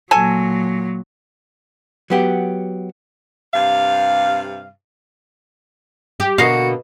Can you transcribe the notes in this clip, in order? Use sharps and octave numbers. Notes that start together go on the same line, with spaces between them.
A#2 F#3 A4 G#5
F#3 B3 G4
G2 C3 F5
G4
B2 D3 A#3 F#4 D#5 F5